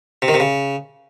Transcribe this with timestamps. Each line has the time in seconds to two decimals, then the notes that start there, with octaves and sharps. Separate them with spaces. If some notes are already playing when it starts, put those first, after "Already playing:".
0.22 C3
0.28 D#3
0.34 C3
0.40 C#3